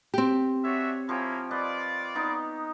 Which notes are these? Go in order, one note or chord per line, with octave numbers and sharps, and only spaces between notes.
C4 G4
D4 F#4 C#5 E5
F3 A#3 C#4 E4 C#5 G5
F4 B4 D5 D#5
B3 D#4